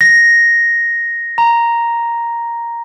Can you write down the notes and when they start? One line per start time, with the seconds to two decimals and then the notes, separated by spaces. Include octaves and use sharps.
0.01 A#6
1.38 A#5